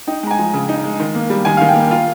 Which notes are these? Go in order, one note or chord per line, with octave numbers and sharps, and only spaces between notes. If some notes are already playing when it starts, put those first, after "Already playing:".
D#4 G5
G#3 A#5
G#5
F3
C#3
D#4
G#3
D#3
A#3
G3
D#3 G#5
D#3 F5
G5
A#3
F4 F5